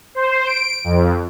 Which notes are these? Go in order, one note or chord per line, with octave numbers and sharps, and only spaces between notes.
C5
D7
F2